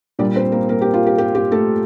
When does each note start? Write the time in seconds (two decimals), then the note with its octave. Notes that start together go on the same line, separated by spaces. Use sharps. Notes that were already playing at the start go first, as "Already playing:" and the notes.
0.19 A#2 G3 D4 D5
0.36 C4 C5
0.52 A#3 A#4
0.69 A#3 A#4
0.81 G4
0.94 F4
1.06 G4
1.18 G4
1.35 G4
1.52 A3 A4